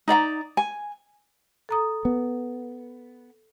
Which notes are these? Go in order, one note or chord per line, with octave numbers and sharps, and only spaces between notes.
D#4 D5 F5 A#5
G#5
A4 A#5 D#6
B3